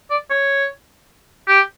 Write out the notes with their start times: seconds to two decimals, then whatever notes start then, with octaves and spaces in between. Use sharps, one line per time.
0.11 D5
0.30 C#5
1.48 G4